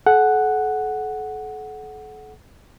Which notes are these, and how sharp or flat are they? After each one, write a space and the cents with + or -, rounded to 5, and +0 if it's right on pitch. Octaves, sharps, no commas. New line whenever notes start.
A4 -40 F#5 +0